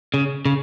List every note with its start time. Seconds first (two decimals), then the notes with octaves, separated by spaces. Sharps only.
0.14 C#3
0.45 C#3